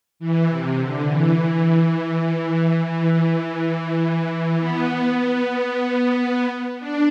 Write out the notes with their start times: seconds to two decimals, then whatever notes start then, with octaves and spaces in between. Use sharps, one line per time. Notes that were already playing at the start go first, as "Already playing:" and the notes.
0.19 E3
0.49 C3
0.78 D3
1.07 E3
2.84 E3
4.60 B3
6.80 D4